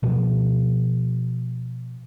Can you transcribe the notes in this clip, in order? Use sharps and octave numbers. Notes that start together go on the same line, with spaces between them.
B2 F3